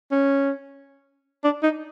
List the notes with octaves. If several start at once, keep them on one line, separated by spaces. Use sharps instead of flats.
C#4
D4
D#4